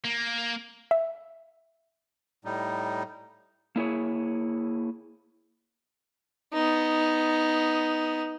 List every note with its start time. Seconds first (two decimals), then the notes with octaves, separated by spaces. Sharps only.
0.05 A#3
0.91 E5
2.45 A2 G3 D#4
3.76 A#3 E4 G#4 C#5
6.54 B3 D#4